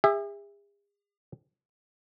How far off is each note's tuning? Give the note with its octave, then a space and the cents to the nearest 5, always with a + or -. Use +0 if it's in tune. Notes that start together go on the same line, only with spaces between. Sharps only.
G#4 -45 E5 +0